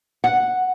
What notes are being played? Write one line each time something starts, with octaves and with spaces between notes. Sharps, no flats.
F#5